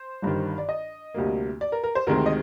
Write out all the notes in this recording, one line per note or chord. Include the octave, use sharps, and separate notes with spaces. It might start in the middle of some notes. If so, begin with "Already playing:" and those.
Already playing: C5
G1 G2 D#3
D5
D#5
D2 C3 G3 A#3
D5
A#4
A#4
C5
D2 C3 D#3 G#3 C4 A#4
D#5